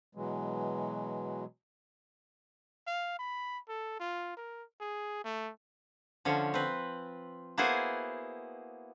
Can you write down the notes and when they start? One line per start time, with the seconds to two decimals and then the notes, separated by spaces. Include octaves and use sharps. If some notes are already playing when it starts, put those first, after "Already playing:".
0.15 B2 E3 F#3 G#3
2.87 F5
3.19 B5
3.69 A4
4.00 F4
4.37 A#4
4.80 G#4
5.24 A3
6.25 D3 F3 C#4 C#5
6.54 C4 B4
7.58 A#3 B3 E4 F#4 G#4 C5